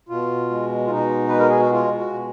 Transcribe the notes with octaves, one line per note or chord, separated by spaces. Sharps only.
B2 F4
G#3
F4
B2 D#4
G#3 B4
A#4
G#4
F#4
G#3 F4
F#4
B2